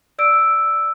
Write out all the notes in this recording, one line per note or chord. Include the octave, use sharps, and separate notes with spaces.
D5 E6 D7